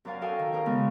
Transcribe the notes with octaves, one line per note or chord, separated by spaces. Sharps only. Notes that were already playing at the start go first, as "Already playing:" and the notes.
F#2 F#3 A#4 D5 F5 G#5
F#4 A4 D#5 F5 G5 G#5
D#3
G#4 A#4 C#5 G5
C#3 G#3 B3